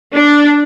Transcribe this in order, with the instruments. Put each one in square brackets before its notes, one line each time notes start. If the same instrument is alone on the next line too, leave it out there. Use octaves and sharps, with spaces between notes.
[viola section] D4